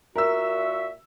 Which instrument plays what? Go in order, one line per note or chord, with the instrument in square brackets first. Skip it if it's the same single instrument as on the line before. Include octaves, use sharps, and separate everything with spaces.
[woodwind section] A#2 F#4 E5 [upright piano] A#4 E6